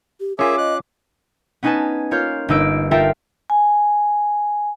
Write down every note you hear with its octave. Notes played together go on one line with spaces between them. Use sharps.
G4
C#4 F4 G#4 A#4 E5 D6
D#5 F#6
B3 C#4 D#4 B4 G#5 A5
A#3 F4 C#5 F6 G6
G1 A#3 D#4 E6 D7
D#4 F4 A4 A#4 E5 G5
G#5